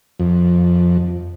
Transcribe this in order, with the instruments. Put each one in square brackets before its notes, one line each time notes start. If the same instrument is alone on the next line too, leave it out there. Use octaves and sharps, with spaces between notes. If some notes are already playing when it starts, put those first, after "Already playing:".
[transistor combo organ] F2